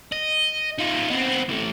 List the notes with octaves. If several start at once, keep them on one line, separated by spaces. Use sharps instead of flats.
D#5
D#4 F4
B3 C4
E3 A3